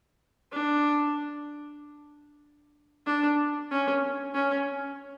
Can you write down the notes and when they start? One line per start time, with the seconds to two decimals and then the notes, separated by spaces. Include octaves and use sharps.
0.52 D4
3.06 D4
3.71 C#4
4.34 C#4